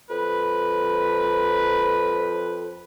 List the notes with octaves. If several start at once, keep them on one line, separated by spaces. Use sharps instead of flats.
F2 B4